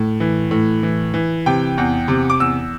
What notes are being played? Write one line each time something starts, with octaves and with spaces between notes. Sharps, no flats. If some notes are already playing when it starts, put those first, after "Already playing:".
Already playing: A2
E3
A2
E3
E3
C3 G5
E2
C3
D6
E2 E6